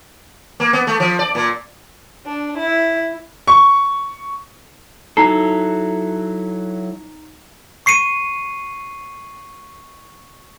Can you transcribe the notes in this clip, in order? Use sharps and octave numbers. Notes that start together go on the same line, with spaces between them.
A#3
B3
A3
F3
D5
A#2
D4
E4
C#6
F#3 D#4 E4 A4 A#5 C7
C#6 C7 C#7 D#7